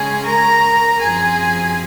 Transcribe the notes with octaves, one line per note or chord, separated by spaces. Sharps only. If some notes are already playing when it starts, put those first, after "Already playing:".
Already playing: C#3 G#3 C#4 G#4 G#5
A#4 A#5
F#2 F3 C4 G#4 G#5